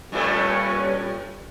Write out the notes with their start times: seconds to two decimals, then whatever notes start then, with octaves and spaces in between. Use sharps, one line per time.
0.12 G2 A#2 G3 A3 C#4 B4 C#5